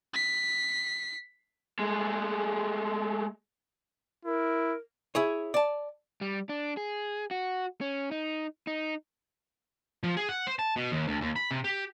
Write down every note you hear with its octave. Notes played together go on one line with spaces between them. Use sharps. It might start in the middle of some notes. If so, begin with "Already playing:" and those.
B6 C7
G#3 A3
E4 A#4
E4 G#4 C#5
D5 A5
G3
D4
G#4
F#4
C#4
D#4
D#4
F3
G#4
F#5
C5
A5
B2
D#2
D2
D#2
B5
C3
G4